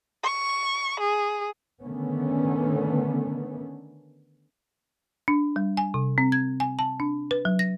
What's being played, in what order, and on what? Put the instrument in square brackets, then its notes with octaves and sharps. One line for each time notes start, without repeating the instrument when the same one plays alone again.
[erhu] C#6
G#4
[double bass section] D3 D#3 A3 B3 C#4
[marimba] D4
G3
G#5
C3
C4
G#6
G#5
A5
D4
B4
F#3
A#6